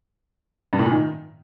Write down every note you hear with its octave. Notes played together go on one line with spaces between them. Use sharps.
G2
A2
A#2
D#3